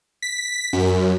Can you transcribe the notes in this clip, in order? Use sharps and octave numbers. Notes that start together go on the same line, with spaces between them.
B6
F#2